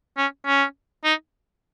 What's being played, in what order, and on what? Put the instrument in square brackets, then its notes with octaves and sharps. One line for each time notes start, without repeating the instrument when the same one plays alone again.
[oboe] C#4
C#4
D#4